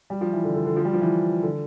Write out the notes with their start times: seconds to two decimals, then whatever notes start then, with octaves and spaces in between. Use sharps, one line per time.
0.10 G3
0.21 F3
0.33 E3
0.44 D3
0.55 D3
0.66 D3
0.76 F3
0.85 G3
0.93 F3
1.01 E3
1.43 D3